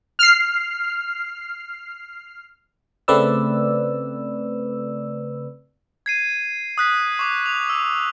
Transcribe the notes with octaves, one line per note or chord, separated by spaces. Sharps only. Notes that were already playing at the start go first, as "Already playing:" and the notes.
F6 C7
C#3 A3 C4 B4 D5 E6
G#6 C7 D#7
D#6 F#6 B6
C#6 D6
F7
E6